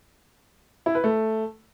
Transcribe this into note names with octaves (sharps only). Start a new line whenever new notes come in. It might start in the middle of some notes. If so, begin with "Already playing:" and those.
E4
B4
A3